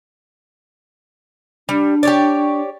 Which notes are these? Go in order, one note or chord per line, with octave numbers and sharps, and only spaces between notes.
G3 D4
G4 C#5 D5